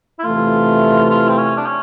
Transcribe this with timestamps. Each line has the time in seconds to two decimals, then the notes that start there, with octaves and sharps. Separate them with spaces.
0.19 E4
0.24 E2 C3 E3 A3 F4
1.10 F4
1.29 C4
1.38 C#4
1.57 D4
1.66 C#4